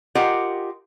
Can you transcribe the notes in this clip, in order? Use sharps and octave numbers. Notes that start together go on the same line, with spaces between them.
F4 G4 A#4 D#5 F#5